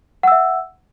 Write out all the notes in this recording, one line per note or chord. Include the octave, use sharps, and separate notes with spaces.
E5 F#5 E6